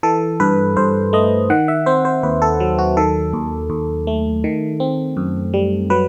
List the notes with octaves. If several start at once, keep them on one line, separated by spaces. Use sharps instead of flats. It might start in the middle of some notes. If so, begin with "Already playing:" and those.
E3 A4
G2 B4
G2 C5
A3 D#5
D#3 F#5
E5
C4 C5
C5
D#2 B4
A4
F#3
F#4
D#3 A4
D#2
D#2
A3
D#3
C4
F#2
G3
F#3 B4